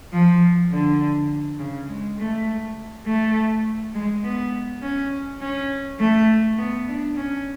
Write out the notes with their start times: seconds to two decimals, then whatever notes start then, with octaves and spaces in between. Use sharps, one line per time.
0.12 F3
0.72 D3
1.59 C#3
1.89 G#3
2.18 A3
3.06 A3
3.94 G#3
4.23 B3
4.82 C#4
5.41 C#4
5.99 A3
6.58 B3
6.88 D4
7.16 C#4